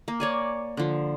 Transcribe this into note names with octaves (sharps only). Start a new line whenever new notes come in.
A#3
C#5 D5 G#5
D3 F3